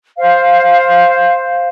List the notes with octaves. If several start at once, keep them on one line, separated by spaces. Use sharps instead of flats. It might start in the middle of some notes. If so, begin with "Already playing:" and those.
C5 F5